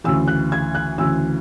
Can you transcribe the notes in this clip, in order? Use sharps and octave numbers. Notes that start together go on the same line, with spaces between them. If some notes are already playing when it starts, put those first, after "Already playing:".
D2 C#3 E3 E6
F#6
G#6
F#6
D2 C#3 E3 E6